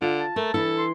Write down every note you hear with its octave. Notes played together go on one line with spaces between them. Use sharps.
D3 F4
A5
A3 A#4
E3 D4 E4 A4
C6